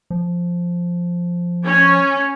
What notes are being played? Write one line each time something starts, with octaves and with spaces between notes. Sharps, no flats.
F3
C#4